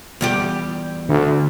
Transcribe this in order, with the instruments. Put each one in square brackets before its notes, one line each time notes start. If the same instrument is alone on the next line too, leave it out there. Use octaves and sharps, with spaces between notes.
[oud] E2 G3 G4
[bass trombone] D2 [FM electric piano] D3